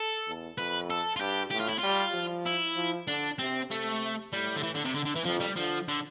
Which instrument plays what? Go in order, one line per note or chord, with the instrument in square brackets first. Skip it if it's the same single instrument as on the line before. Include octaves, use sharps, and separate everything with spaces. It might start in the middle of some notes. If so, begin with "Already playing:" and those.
Already playing: [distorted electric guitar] A4
[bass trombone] E2
[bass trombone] F2 [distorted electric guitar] B4
[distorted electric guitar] A4
F4
[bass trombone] G2 [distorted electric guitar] G4
[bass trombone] A2 [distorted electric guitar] G4
[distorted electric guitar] F4
E4
[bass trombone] G3 [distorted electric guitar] F4
[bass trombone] F3
[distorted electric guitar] E4
[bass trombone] F3
[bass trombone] D3 [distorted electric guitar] D4
[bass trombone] C3 [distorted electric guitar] C4
[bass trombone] C3 [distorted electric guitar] A3
[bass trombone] A2 [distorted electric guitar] G3
[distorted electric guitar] D3
E3
D3
C3
D3
D3
E3
[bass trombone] F2 [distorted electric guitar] F3
[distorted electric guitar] G3
[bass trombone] D3 [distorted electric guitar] F3
[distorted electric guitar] D3